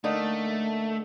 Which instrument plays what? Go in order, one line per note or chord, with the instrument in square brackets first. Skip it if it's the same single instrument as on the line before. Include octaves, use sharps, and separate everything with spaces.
[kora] D3 A#3 D#4 [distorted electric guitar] A3